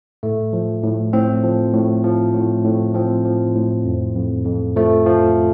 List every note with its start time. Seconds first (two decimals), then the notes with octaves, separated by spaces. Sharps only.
0.23 A2 A3
0.53 F3
0.84 A2
1.13 A2 C4
1.44 F3
1.73 A2
2.04 F3
2.35 A2
2.64 A2
2.95 F3 C4
3.25 F3
3.55 A2
3.86 F2
4.15 F2
4.45 F2
4.76 F3 A3
5.06 F3